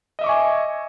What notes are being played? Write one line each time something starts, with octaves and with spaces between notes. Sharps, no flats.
D#5 E5 G#5 C#6 D6